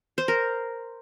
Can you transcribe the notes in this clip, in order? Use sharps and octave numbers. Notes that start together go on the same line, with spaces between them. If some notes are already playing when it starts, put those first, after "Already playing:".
C5
A#4